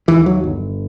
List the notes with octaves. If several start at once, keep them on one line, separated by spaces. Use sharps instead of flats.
D#2 E3
F#3
G1